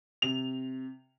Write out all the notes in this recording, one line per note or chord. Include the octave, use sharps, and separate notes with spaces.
C3 F7